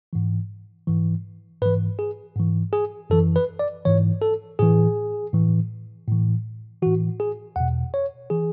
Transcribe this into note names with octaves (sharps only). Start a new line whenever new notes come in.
G#2 E3
G#2 E3
G#2 E3 B4
G#4
G#2 E3
G#4
F#2 E3 A4
B4
D5
G#2 E3 C#5
A4
A2 E3 G#4
A2 E3
A2 E3
A2 E3 F#4
G#4
E2 B2 F#5
C#5
E3 G#4